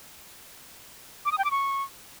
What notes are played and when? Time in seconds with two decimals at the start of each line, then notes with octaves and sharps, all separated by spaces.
1.25 D6
1.32 D#6
1.38 G5
1.45 D6
1.51 C#6